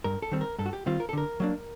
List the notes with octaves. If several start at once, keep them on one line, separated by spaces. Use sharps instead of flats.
G2 A#4
A4
D#3 G3 C4
A#4
G2 A4
F#4
G4
D#3 G3 C4 F4
A#4
A4
D3 A#4
F#3 A#3 D4